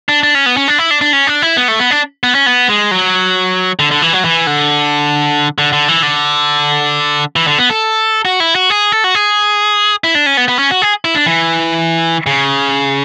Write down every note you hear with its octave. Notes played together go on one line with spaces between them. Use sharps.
D4
D4
C#4
B3
C#4
D4
E4
D4
D4
C#4
D4
E4
B3
A3
B3
D4
B3
C#4
B3
G#3
F#3
D3
D3
E3
F#3
E3
D3
D3
D3
E3
D3
E3
D3
B3
A4
F#4
E4
F#4
G#4
A4
F#4
G#4
E4
D4
C#4
B3
B3
C#4
F#4
G#4
E4
D4
E3
C#3